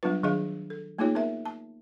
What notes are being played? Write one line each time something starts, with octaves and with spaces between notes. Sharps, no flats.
F#3 G3 B3 D4 F4 B4
D#3 F#3 D4 G#4 D#5 F5
A4
A3 A#3 D#4 F4 G#4 C#5
B3 A#4 E5
A5